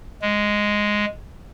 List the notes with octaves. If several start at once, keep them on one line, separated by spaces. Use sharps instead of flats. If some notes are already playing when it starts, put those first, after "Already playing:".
G#3